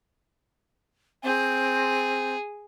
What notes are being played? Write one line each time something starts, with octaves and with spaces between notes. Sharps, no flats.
C4 G#4